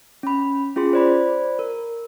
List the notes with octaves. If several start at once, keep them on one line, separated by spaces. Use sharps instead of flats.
C#4 B5
C#4 F4 G#4 C6
C5 D5 B5
A#4